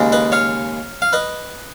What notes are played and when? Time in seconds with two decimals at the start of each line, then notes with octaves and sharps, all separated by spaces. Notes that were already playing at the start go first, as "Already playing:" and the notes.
Already playing: D#2 C#3 G#3
0.12 B4 D#5
0.32 C#5 F5
1.02 F5
1.13 B4 D#5